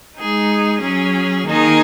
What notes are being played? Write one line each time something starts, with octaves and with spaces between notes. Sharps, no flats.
G#3 D#4 G#4
F#3 C#4 G#4
D#3 A#3 D#4 G#4